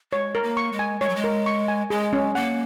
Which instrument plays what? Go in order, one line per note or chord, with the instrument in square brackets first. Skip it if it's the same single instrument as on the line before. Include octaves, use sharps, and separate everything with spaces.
[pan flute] G#3 [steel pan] C#5
[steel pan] A#4
[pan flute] A#3
[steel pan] C#6
[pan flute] G#3
[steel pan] G#5
[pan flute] G#3 [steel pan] C#5
[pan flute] F#3
G#3
[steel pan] A#4
C#6
G#5
[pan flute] G#3 [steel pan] G#4
[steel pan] C#4
[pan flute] A#3 [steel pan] F#5